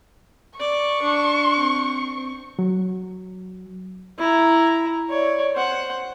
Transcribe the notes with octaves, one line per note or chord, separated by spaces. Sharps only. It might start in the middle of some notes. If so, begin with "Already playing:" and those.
D5 C#6
D4
C4
F#3
E4 A#5
C#5 D5
C5 F#5